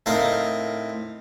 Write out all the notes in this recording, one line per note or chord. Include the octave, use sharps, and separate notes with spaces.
A2 C4 D#4 A#4 F5